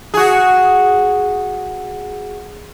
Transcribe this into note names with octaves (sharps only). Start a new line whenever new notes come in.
F#4 G#4